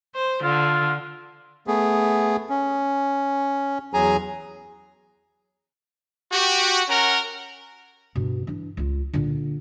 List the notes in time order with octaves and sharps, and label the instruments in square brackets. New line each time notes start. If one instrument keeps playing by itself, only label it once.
[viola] C5
[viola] D3 [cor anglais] F4
[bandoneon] A3 B3 G#4
C#4
E2 F#3 G#4 G#5 A#5
[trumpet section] F#4 G4
C#4 A#4 F#5 A#5
[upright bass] G2 B2
E3 D4
C#2 F4
A#2 D3